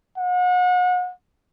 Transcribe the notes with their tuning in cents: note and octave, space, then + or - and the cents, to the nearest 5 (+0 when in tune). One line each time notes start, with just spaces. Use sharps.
F#5 -35